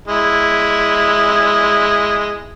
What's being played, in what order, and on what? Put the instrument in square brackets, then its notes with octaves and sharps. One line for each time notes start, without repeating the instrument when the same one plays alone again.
[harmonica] G#3 E4